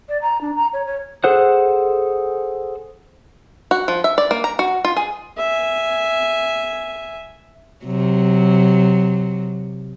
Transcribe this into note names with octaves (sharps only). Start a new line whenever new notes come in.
D5
A#5
D4
A#5
C#5
C#5
G#4 A4 C5 F#5 F#6
F#4
F3
E5
D5
A#3
A#5
F#4
F4
G#4
E5 G#5
C3 F#3